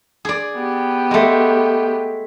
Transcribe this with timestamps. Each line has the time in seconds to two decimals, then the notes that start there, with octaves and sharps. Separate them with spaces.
0.25 G#4 D5
0.57 B3 G4
1.11 G#3 A3